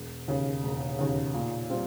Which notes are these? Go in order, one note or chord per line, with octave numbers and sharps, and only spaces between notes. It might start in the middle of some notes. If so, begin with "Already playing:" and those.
Already playing: E1
D#2 C#3
E1
D#2 C#3
A#2
G3 C4 F4